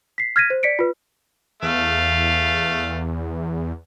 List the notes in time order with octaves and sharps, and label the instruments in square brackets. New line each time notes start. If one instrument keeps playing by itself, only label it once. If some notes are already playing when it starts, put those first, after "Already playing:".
[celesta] B6 C7
F6 G#6 A#6 B6 D#7
C5
D5 B6 C#7 D7
F4 B4
[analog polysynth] E2 [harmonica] A3 F5